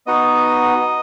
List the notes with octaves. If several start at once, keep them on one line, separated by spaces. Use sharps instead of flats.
B3 D#4 F#4 D#5